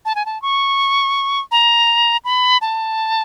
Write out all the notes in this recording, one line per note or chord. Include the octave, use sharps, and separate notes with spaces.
A5
G#5
A5
C#6
A#5
B5
A5